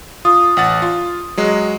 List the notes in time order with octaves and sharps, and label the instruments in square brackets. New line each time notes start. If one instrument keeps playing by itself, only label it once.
[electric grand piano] F4 [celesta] D#6
[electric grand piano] A1 F#5 A6
F4
F#3 G#3